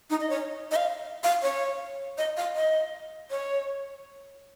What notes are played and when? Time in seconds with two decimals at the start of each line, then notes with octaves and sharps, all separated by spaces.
0.10 D#4
0.20 D#5
0.30 C#5
0.71 D#5
0.76 F5
1.24 F5
1.42 C#5
2.18 D#5
2.37 F5
2.56 D#5
3.31 C#5